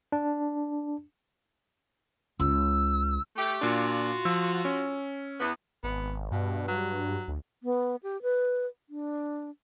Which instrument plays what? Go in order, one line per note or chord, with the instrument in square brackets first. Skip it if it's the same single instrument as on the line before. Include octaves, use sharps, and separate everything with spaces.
[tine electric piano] D4
[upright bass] C#2 [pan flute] E6
[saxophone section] A3 G4
[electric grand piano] A#2 D4 [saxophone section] F4 F#4
[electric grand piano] F3 E6
C#4
[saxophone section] E2 B3
[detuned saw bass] G#1 [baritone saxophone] B3
[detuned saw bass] G2 [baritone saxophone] B2
[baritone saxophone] F#3
[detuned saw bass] D2
[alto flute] B3
G4
B4
D4